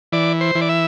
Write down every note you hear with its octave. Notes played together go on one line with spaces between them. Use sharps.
E3 D5
C5
E3
D5
E5